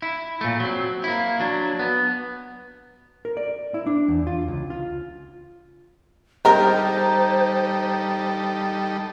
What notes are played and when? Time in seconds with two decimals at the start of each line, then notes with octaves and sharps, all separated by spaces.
0.02 E4
0.41 A#2 A3
0.60 F#3 C4
1.04 A#3 E4
1.40 F#3 D4
1.79 B3
3.25 A#4
3.37 D5
3.74 E4
3.86 D4
4.08 E2
4.27 F4
4.48 C#2
4.70 F4
6.45 G3 G#3 D#4 G4 A4 A#4 C5 A#5